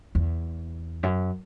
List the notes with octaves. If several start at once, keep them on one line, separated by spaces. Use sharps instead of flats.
E2
F#2